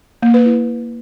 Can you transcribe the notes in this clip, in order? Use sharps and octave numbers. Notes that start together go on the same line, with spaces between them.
A#3
B4
E4